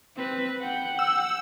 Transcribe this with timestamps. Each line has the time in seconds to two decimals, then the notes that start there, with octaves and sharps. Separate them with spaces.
0.16 C4 B4
0.61 F#5 G5
0.99 E6